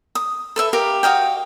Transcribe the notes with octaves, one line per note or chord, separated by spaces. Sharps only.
D#6
A4 B4 E5
G4 A#4 F5
F#4 D#5 F5 G5